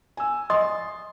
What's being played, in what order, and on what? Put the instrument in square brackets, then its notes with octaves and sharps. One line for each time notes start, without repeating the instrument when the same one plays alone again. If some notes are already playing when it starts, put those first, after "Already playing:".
[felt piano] G#5 E6
[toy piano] D#5 D#6 [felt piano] C6